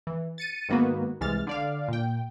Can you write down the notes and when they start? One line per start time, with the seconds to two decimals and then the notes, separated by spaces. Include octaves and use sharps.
0.07 E3
0.38 A6 C#7 D#7
0.69 G#2 D#3 A#3 B3 F#4
1.21 C2 E3 G#3 F6 A6
1.47 D3 D5 F5
1.88 A#2 G5